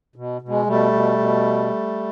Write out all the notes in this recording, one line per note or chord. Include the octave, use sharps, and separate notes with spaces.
B2
B2
G#3
B2 G3 A3
B2
B2